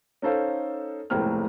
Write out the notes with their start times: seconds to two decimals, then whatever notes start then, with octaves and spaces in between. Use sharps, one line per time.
0.22 C#4 D#4 A4 C5 F5
1.10 F1 C#2 A2 A#3 C5 F6